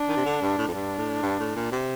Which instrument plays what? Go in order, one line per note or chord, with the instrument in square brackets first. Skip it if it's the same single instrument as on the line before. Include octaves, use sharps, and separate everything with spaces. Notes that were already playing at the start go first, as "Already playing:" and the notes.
Already playing: [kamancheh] D4
[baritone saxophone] D#3
C3
D3
G2
A2
F2
[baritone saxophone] G2 [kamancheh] D4
[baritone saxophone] A2
G2
A2
A#2
C3